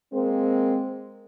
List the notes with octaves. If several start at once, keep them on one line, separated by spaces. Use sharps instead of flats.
G#3 A#3 C4